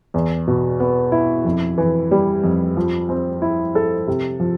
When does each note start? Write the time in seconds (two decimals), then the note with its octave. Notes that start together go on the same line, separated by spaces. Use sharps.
0.14 E2
0.48 B2
0.80 B3
1.12 E4
1.45 F2
1.78 E3
2.11 G3
2.44 F2
2.77 F3
3.09 C4
3.42 E4
3.75 A4
4.07 C3
4.40 F3